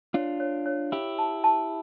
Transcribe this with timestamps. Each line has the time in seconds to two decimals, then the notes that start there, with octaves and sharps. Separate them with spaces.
0.14 D4 F4 C#5
0.40 C#5
0.66 C#5
0.92 E4 G4 F5
1.19 A5
1.44 A5